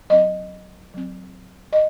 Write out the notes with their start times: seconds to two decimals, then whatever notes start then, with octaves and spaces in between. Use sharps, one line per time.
0.10 F#3 C4 D#5
0.94 F#3 C4
1.73 D#5